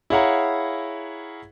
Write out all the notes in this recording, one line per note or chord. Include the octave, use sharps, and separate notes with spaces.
E4 G#4 C#5 F5 F#5 A#5